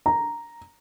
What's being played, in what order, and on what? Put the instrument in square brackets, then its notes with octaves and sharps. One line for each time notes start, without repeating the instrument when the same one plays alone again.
[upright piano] A#5